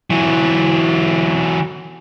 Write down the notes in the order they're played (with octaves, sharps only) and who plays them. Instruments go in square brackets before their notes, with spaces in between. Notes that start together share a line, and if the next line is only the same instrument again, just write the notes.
[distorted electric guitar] E3 F#3